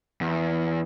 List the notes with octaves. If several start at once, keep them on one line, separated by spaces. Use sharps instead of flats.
E2